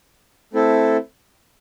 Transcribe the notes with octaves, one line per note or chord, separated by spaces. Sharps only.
A3 C4 E4 A4